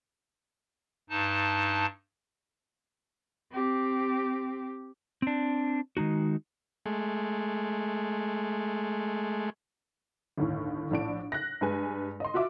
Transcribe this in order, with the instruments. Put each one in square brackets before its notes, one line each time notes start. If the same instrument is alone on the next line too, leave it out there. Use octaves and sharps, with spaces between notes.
[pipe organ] G2 D#4 A5
[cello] C4 G4
[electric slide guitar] C4 D4
D#3 G#3 D#4 F#4
[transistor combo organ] G#3 A3
[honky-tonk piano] G1 D#2 A2
A#1 A2 D4 D7
F#6 A#6
G2 G#3 B4 G#5
D#5 C6
F4 F#4 E5 D6